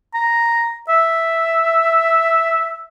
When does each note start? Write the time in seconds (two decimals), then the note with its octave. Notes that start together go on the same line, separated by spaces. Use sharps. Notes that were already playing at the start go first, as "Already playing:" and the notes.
0.14 A#5
0.89 E5